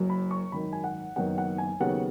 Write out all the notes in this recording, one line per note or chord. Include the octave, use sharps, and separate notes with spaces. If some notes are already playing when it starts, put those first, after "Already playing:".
Already playing: F#1 F#2 F#3
B5
C#6
G#1 F#2 D#3 B5
G#5
F#5
F#1 F#2 D#3 F#3 B3 F#5
F#5
G#5
D#2 C#3 F#3 B3 F#5